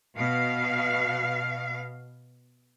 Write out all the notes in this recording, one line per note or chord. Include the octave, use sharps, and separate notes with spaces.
B2 F5